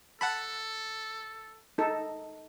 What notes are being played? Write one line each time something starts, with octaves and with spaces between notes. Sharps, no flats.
A4 F#5 A5 B5
D#4 A4